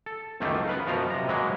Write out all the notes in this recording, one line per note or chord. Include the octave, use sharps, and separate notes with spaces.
A4
C#2 F#2 D#3 A3 A#3
B3 B4 F5
F#2 B2 F3 F5 A#5
C3 A#5
F#3 G#3 A#3 B4